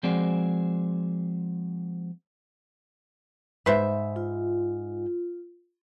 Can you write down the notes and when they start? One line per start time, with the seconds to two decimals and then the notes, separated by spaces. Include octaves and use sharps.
0.03 F3 G#3 C4 F#4 G#4 D5
3.66 G#2 B4 C5 E5
4.16 F4